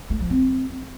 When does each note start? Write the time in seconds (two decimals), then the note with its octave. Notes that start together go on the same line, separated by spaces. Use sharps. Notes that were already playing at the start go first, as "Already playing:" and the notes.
0.10 A3
0.20 F3
0.30 C4